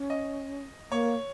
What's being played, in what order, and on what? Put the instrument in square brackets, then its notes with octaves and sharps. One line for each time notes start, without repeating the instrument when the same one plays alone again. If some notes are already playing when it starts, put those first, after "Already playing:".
Already playing: [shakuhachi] C#4
[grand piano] D#5
[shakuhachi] A#3 [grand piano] C#5